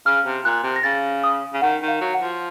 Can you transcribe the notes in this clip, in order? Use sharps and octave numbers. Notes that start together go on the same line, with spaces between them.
C#3 F6
C3
A#2 F#6
C3
A#6
C#3 A6
D#6
C#3
D#3 F#5
D#3
F5
F#3
F#5
F3